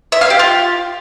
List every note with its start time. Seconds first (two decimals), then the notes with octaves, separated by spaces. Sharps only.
0.12 E5
0.21 F5
0.30 G4
0.39 F4